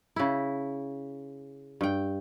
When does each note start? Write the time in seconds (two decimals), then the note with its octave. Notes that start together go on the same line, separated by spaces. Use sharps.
0.16 C#3 E4
1.81 G2 G5